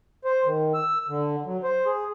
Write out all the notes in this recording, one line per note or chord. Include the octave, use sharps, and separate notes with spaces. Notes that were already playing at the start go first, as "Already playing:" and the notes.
C5
D#3
E6
D3
F#3
C5
G#4